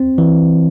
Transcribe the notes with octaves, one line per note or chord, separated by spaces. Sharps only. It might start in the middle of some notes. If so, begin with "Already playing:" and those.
Already playing: C4
E3